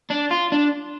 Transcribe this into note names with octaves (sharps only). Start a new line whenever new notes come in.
D4
F4
D4